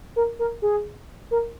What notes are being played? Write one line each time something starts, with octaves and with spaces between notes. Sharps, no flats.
A#4
A#4
G#4
A#4